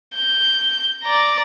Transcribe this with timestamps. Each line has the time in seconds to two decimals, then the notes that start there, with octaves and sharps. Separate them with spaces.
0.15 G6
1.03 D5 A#5